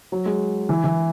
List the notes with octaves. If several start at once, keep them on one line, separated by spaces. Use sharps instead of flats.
F#3
G#3
E3
E3